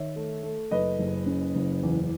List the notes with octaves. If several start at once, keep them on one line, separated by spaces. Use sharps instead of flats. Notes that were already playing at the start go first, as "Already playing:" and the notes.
Already playing: D#3 C#5 E5
A3
A3
F#1 B4 D#5
F#1
C#3
F#1
E2